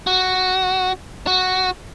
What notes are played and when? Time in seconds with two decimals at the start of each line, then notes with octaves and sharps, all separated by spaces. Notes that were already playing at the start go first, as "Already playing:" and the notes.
0.07 F#4
1.27 F#4